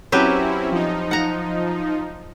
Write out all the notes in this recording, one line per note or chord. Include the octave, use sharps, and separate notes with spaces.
F#3 C4 C#4 E4 G4 B4
F3 D#4
F#5 A#5